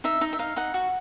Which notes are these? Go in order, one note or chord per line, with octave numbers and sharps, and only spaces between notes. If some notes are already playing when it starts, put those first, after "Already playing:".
D#4 E5
D#4
E5
D#4 F5
D#4 F#5
F#4